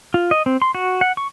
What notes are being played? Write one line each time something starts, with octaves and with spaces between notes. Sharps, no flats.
F4
D#5
C4
C6
F#4
F#5
C#6